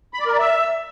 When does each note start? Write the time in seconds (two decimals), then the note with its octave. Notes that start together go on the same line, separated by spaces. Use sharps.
0.14 B5
0.20 D5
0.26 A#4
0.32 D5
0.39 E5